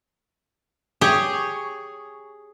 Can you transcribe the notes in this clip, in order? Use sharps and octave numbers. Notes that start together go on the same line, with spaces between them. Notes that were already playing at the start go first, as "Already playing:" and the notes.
G4 G#4 C#5